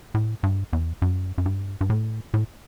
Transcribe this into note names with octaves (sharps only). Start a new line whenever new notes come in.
A2
G2
E2
F#2
F#2
G2
G2
A2
A2